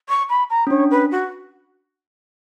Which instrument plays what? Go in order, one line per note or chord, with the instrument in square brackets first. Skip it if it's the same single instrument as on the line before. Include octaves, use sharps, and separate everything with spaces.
[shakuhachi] C#6
B5
A#5
[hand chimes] C#4
[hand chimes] D4 [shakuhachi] C#5
[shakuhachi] B4
F#4